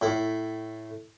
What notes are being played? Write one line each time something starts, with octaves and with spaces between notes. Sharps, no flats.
A2 E4